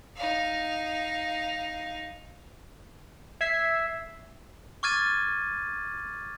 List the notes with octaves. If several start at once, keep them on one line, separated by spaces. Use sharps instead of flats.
D#4 F5
E5 G#6 B6 C7
C#6 D6 F6 G#6 A6 D#7